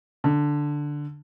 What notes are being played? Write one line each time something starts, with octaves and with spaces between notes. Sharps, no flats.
D3